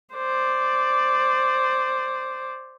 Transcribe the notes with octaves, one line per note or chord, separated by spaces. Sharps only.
C5 D5